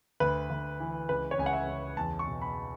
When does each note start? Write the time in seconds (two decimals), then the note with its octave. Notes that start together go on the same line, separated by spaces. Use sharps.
0.20 D2 B4
0.50 D2
0.80 E3
1.09 C#2 B4
1.31 C#5
1.39 C#2 G#5
1.46 F#5
1.53 E5
1.68 C#2
1.97 E2 A5
2.19 C#6
2.27 B2
2.42 B5